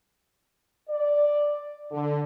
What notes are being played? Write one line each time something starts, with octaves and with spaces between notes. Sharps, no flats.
D5
D3